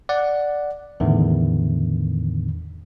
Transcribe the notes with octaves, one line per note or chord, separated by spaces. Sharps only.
D5 F#5
E2 A2 D3 D#3